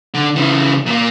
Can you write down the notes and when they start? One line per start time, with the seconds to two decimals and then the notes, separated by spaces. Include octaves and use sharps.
0.14 D3
0.36 C#3 E3
0.86 A#2 A#3